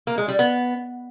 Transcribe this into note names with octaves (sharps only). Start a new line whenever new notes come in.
A#3
G#3
G3
B3